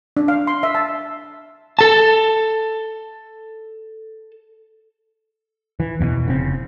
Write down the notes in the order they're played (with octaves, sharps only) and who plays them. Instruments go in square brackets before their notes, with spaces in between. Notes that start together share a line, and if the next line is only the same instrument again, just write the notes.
[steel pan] D4
F5
C6
E5
A5
[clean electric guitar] A4 A5
[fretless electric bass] E3
E2 G2 B2 E3
F1 C#3 C4